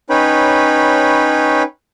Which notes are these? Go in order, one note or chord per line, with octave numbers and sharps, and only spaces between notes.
C#4 D#4 B4 C#5 G5 B5